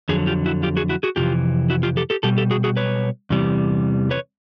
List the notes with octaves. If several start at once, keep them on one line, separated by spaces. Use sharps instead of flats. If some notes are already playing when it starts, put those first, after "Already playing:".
F2 D3 F#3 G#4
F4 G4
E4 F#4
F4 G4
F#4 G#4
E4 F#4
F#4 G#4
F2 C3 E3 F4 G4
E4 F#4
F4 G4
G4 A4
G4 A4
B2 G3 G4 A4
G4 A4
F#4 G#4
F#4 G#4
B4 C#5
E2 C3 E3 G3
B4 C#5